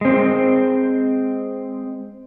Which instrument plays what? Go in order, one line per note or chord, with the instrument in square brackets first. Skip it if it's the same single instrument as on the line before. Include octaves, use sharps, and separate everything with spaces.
[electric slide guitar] G#3 C4